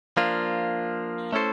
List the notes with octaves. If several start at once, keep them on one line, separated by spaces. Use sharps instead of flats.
F3 A#3 D4 F4
A3 C#4 E4 A4 C5